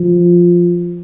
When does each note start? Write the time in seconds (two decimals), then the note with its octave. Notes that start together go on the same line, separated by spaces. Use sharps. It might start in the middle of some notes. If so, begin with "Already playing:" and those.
Already playing: F3